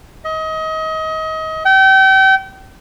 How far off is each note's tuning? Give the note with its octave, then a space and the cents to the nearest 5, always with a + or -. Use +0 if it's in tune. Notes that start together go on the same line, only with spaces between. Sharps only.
D#5 +30
G5 -35